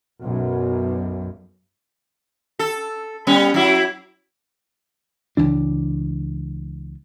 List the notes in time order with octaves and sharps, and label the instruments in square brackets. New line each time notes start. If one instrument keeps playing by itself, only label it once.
[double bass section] B1 F#2
[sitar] A4
G3 B3 C#4
F#3 E4
[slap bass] C#2 E3 D4